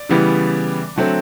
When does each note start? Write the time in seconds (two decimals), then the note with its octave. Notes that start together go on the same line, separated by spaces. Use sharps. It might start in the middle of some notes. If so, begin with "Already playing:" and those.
Already playing: D5
0.09 C#3 E3 G3 B3
0.96 D3 F#3 A3 C4